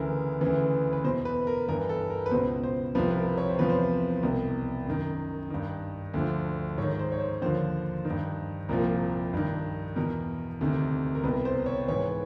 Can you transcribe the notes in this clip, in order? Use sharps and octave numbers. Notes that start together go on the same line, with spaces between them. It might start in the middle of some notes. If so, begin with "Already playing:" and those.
Already playing: D2 C#3 E3 A#4
D2 C#3 E3
B4
E2 B2 C5
B4
A#4
G2 E3 A#4
A4
A#4
B4
C#2 B2 C5
C5
C2 C3 F3 B4
B4
A#4
C#5
C5
E2 C3 F3 B4
C5
C2 B2
F#2 D#3
G2 D#3
D2 D3 F3
G#2 D#3 C#5
C5
C#5
C5
D#2 D3 F3 C5
D#3
G2
C2 A#2 F3 A#4
G2 D#3
E2 B2 A#4
D2 C3 D#3
A#4
C2 B2 B4
C5
C#5
G#2 E3 C#5